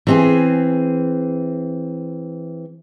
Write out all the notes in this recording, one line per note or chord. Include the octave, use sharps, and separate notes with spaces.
E3 C4 G#4